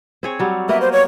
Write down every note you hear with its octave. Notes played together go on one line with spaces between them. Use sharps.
C4 G#4 C#5
F#3 G3
A#3 B3 D#5 E5
C5
C#5